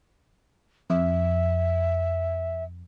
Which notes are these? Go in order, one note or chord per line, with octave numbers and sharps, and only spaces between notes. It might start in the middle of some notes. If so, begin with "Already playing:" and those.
F2 E5